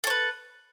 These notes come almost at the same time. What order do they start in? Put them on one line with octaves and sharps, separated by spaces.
A4 C#5 B4